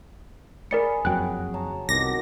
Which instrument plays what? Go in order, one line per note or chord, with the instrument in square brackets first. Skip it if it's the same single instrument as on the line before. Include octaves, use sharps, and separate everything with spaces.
[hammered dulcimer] G#4 G#5 B5 [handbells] A#4 D5 C#7
[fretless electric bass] F#1 F2 F#3 [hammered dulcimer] F#4 [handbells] G5 F#6
[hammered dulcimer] C#5 A5 A#5
[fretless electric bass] C2 [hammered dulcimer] B2 D#3 D6 [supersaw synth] A#6